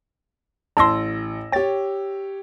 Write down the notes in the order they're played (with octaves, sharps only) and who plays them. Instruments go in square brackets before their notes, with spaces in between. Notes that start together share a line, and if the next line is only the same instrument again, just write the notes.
[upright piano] A1 E6 A#6 [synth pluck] A5 C6
[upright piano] G4 C#5 [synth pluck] G5 A6